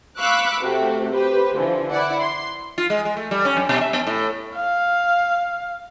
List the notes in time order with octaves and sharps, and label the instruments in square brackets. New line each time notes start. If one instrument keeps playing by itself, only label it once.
[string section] F5 B5 C#6 D6 E6 F#6
C3 A3 F#4 G4
G4 B4 C5
D3 E3 F3
E4 D5 F#5
C6
[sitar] F4
G#3
G#3
A3
G3
C#4
F#2
B2
E5
B3
A2
[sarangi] F5